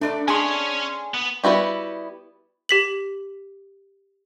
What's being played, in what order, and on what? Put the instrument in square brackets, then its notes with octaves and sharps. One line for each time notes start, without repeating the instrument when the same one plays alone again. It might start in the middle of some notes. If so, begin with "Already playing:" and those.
[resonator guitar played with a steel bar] A3 B4 D5 [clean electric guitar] D4
[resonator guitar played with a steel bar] B3 D4 G#4 [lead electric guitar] C#4 C#5 [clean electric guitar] G#5 C6
[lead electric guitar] B3
[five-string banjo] G3 B3 E4 F#4 G4
[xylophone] G4 B6 F#7